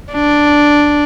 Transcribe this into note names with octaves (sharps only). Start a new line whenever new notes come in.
D4